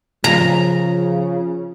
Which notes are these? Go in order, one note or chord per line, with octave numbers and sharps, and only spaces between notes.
C#3 F3 A#5